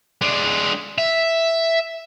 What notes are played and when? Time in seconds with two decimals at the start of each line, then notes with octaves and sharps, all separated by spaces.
0.21 G#3 D4
0.98 E5